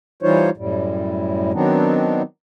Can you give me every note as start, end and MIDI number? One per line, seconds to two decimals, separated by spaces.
0.23 0.50 52
0.23 0.50 55
0.23 0.50 63
0.23 0.50 65
0.23 0.50 72
0.23 0.50 73
0.57 1.52 42
0.57 1.52 45
0.57 1.52 55
1.53 2.22 51
1.53 2.22 54
1.53 2.22 59
1.53 2.22 60
1.53 2.22 62
1.53 2.22 63